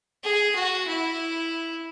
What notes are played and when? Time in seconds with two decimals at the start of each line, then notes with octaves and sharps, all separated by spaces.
0.24 G#4
0.55 F#4
0.88 E4